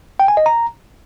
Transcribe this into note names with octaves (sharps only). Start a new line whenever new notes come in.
G5
G#5
D#5
A#5